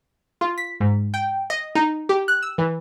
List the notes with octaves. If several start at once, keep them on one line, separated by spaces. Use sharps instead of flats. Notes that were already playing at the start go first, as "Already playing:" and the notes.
F4
B6
G#2
G5
D#5
D#4
G4
F#6
E6
E3